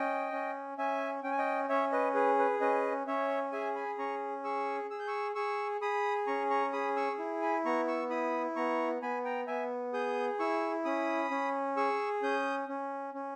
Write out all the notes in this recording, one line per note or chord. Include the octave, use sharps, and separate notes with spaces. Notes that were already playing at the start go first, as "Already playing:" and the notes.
Already playing: C#4 D#5 G5
C#4
C#4 E5 G#5
C#4 G5
G#5
D#5 G5
C#4 C#5 E5
B4 D#5
G#4 B4
B4
C#4 B4 D#5
C#4 C#5 E5
G#4 E5 G#5
G#5 B5
C#4 A#5 C#6
G#4 C#6 E6
G#4 E6
G6
C#6 E6
G#4 C#6 E6
G#4 B5 D#6
C#4 A#5 C#6
A#5 C#6
G#4 B5 D#6
C#6 E6
E4
G#5 B5
B3 A#5 C#6
C#6 E6
E4 B5 D#6
B3 A#5 C#6
B3 G#5 B5
G5 A#5
B3 E5 G#5
G#4 D#6 G6
E4 C#6 E6
C#4 B5 D#6
C#4
G#4 C#6 E6
C#4 D#6 G6
C#4
C#4